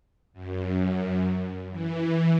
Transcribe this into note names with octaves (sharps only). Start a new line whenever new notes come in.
F#2
E3